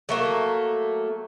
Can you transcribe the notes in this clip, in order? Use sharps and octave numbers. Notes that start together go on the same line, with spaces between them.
F#3 A3 A#3